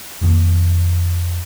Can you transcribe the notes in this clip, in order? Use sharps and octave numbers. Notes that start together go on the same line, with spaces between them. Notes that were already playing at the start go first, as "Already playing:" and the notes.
F1 F2 D#3 A#3